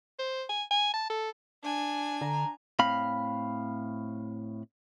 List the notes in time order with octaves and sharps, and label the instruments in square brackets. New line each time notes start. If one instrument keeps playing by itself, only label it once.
[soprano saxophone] C5
G#5
G#5
A5
A4
[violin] D4 G#5
[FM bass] D3 [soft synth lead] A#5
[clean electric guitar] A2 C4 F5 B5